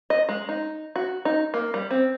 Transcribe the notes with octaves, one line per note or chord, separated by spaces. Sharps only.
D#5
G#3
D#4
F#4
D#4
A#3
G3
C4